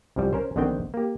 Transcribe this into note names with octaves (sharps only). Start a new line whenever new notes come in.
C2 F#2 F3 G3
C#4 A#4 C5
A#1 D3 D#3 B3 C4 G5
A#3 G4